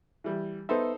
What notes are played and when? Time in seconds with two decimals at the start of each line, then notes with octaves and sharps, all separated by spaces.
0.24 E3 G3
0.69 B3 D#4 A4 B4 C5 E5